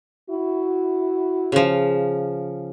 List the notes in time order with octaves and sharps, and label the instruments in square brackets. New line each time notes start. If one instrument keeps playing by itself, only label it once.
[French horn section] E4 F#4
[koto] C#3 F3